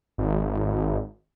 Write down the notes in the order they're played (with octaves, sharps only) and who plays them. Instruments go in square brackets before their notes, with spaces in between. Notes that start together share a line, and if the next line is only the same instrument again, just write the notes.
[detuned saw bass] G#1